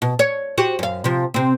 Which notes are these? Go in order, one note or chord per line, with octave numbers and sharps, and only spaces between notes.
B2
C#5
F#4 G4 C5
F#2 F5
C3 F3
C3 C4